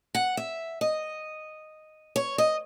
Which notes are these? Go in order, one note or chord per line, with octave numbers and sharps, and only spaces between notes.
F#5
E5
D#5
C#5
D#5